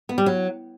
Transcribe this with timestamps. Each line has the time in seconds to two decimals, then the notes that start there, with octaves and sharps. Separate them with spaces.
0.09 B3
0.18 G3
0.26 F#3